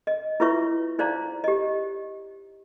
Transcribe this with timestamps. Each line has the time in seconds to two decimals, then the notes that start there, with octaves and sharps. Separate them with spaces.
0.07 D#5
0.40 E4 F4 B4 C#5 E5 C#6
0.99 D#4 C5 D5 F5 A#5
1.44 G4 D#5